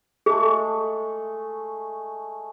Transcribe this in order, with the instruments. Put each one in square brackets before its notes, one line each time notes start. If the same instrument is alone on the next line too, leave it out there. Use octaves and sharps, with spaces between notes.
[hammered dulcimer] G#3 A3 [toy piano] G#4